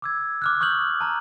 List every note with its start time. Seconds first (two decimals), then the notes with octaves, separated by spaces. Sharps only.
0.02 D6 E6 G#6
0.42 D6 F6 F#6
0.61 C#6 D#6 F6 G6 F#7
1.01 A5 A#5 F6